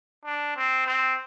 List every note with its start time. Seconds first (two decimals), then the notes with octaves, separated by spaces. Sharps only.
0.25 D4
0.57 C4
0.86 C4